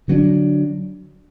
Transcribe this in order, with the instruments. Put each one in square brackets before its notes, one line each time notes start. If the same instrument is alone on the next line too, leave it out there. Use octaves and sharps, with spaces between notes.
[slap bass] D3 F#3 B3 D4